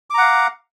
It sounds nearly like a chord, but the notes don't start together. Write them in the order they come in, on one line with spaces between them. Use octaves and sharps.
D6 A#5 F#5 F5